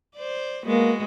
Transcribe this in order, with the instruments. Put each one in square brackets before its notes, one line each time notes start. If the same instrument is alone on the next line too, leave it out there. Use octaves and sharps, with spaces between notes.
[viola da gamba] C5 D5
[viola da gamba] G#3 B3 F#4 [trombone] A#3